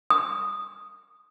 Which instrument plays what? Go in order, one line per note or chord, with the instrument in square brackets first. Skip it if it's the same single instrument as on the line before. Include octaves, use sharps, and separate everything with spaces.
[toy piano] D#6